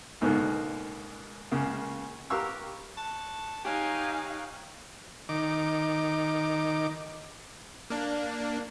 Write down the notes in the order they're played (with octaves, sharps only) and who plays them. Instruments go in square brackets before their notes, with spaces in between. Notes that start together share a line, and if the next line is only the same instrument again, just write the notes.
[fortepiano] C#2 G#2 B2 D3 A#3 B3
C#2 C#3 A#3
G4 A#4 B4 F5 C#6 E6
[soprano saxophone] A5 [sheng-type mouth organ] C#6 F#6
[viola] D#4 F5 [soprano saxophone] G4 [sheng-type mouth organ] C#5 G5 F#6 [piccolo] G#5
[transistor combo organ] D#3 D6
[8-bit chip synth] A#3 D4